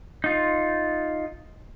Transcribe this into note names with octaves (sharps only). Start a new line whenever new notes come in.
D#4 F4